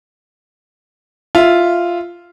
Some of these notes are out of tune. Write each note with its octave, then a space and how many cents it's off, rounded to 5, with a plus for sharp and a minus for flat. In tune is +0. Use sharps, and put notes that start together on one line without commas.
F4 -5 E5 +0